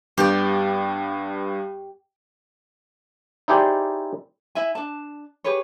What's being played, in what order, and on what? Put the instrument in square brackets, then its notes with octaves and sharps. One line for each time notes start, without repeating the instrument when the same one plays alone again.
[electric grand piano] G2 G3 B3 [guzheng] G4 D5
[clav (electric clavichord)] D#4 E4 G4 G#4 C5 D5
[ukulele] E4 E5 G#5
D4 A5
G4 G#4 B4 C#5